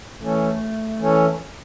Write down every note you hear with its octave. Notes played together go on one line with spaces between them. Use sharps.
E3 A3 C#4 A4 C#5
E3 C#4 A4 C#5